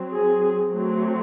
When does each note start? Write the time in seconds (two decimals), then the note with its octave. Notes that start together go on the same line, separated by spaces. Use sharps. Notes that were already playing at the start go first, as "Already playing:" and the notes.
Already playing: F#3 C4
0.12 G#4
0.74 F#3 A3 C4